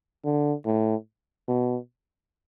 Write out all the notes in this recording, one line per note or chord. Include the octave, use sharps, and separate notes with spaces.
D3
A2
B2